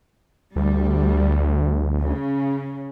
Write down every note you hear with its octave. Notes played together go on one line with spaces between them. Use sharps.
D2 G3
C#3